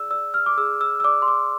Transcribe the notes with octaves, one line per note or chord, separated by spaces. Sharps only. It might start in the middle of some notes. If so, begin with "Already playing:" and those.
Already playing: G#4 D5 E6
D5 E6
F6
D6
G#4 E6
E6
E6
D5 D6
C6
D6